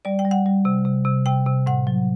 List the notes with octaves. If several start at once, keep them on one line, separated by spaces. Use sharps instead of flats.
G3 D5
G5
G3
F#5
G3
C3
C3
C3
C3 G5
C3
A2 F#5
F#3